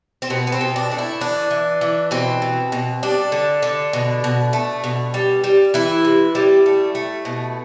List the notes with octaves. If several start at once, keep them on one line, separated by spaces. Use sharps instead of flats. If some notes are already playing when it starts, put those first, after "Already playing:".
C4
B2 B3
B3
C4
B2
D4
A3 D4
E4
E3 D4
E3
E3
B2 C4
B2
B2
G3 D4
D3
D3
B2
B2
A3
B2
G3
G3
E3 E4
C3
G3
A3
A3
B2